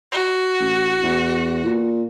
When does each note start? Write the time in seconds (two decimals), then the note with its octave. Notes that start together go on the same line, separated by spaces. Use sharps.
0.12 F#4
0.60 A1
1.03 E2
1.65 A#2